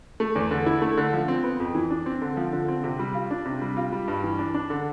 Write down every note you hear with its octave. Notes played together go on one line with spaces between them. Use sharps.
A3
E2
D3
E4
A3
D3
F3
C4
B3
F2
E3
D4
C4
D3
F3
D3
C4
C3
G3
F4
D4
C3
G3
F4
G3
G2
E3
D4
D4
D3